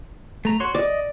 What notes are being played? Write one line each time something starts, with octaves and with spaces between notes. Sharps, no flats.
A3 A#5
F#4 C#5 C6
D5 D#5